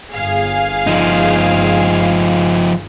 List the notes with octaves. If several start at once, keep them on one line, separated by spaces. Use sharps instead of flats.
G1 G#4 F5
F3 D#4